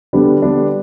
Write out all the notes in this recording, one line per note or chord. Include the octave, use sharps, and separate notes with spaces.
D3 G3 B3 D4
D3 G3 B3 D4